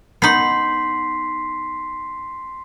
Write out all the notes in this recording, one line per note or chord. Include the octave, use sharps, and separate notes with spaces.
B3 D#4 C6 B6 C7